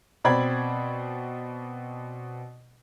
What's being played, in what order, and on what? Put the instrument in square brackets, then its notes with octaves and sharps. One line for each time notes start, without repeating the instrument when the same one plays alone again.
[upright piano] B2 C4 D5 B5 G#6